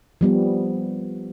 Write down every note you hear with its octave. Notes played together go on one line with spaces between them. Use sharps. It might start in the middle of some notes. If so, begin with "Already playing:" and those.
F3 G3 B3